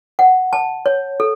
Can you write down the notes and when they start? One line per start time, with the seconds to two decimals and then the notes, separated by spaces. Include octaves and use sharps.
0.19 F#5
0.53 A5
0.86 C#5
1.20 A4